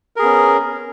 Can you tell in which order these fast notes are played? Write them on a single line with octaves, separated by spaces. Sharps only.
A#4 G#4 B3 C#4